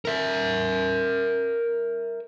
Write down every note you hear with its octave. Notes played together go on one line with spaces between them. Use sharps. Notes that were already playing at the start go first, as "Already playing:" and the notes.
A#4 E5